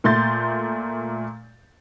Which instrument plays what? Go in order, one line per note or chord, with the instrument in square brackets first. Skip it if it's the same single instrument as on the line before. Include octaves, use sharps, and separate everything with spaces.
[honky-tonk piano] A#2 A3 C6 G6 A6